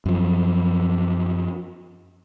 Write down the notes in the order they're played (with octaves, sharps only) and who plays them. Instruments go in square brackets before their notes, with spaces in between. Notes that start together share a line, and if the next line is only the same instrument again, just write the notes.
[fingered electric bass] F#2 F3